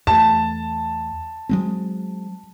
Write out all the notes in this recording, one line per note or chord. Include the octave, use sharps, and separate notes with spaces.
E2 A3 A5
F#3 G#3 C4